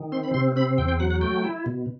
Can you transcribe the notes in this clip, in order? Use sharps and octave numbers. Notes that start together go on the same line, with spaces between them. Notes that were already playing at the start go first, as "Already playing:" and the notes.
Already playing: D#3
C4 C6
B5
C3 C6
C4 B5
E2 G5
G5
F#3 F#5
F#5
A3 G5
E4
B2